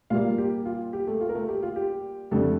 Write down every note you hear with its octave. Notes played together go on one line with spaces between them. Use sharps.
A#2 G3 A#3 F4 F5
G4
F4
G4
A3 A4
F4
A#4
A3 A4
G4
F4
G4
F2 D3 G3 A3 A4